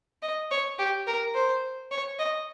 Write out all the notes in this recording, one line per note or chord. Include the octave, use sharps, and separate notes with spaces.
D#5
C#5
G4
A#4
C5
C#5
D#5